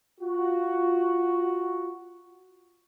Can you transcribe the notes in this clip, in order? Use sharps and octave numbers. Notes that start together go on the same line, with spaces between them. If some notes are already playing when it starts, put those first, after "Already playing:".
F4 F#4